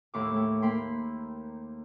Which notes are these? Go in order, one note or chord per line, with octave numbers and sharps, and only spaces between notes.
D#2 A2 A3 C6 D6
A3 G5
A#3 G5 B5 C6